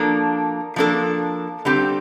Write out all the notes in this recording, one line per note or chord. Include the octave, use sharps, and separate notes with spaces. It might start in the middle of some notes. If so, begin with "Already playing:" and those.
Already playing: F3 A#3 D4 A4
F3 A#3 D4 A4
D3 G3 C4 G4